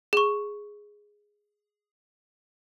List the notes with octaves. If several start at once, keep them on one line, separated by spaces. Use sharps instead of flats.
G#4 C#6